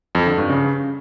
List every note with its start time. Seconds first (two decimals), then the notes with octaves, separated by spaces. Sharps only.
0.15 F2
0.26 D3
0.38 G2
0.50 C#3